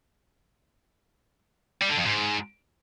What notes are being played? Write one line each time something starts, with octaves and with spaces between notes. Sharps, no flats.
G3
D3
F2
G#2